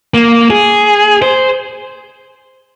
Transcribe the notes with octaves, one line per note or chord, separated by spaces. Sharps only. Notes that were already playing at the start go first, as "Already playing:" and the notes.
A#3
G#4
C5